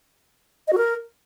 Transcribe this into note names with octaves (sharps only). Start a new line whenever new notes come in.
D#5
F#4
A#4